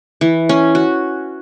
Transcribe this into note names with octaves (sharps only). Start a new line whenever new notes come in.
E3
C#4
F#4